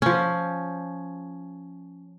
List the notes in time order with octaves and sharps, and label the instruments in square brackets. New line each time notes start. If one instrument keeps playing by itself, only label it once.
[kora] F3 C#4